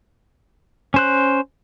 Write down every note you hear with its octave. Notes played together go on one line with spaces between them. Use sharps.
C#4 C5 F#6